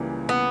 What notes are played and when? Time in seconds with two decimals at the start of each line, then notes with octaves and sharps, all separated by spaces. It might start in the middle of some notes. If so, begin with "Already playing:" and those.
Already playing: C#2 C#3 E3 G3 A#3
0.29 B3